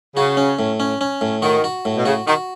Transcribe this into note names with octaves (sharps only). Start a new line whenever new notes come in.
C#3 F#4
C#4
A2
C#4
C#4
A2
D#3 F#4
F#4
A2
B2
C#3 F#4
D#3 F#4